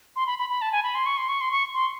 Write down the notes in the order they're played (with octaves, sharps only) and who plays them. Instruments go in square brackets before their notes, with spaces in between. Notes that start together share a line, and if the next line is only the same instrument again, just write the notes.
[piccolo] C6
B5
B5
B5
A5
G#5
B5
C6
C#6
C6
C#6
C6
C#6
C6